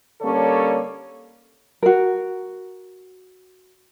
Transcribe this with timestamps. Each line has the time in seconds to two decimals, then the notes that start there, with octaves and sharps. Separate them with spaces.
0.21 D3 G3 A#3 C#4 A4 C#5
1.83 F#4 A#4